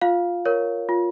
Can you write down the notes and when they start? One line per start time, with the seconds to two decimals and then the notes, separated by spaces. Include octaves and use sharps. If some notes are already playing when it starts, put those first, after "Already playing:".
0.01 F4 F5
0.46 A#4 C#5
0.89 F4